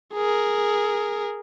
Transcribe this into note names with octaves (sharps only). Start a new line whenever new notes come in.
G#4 A#4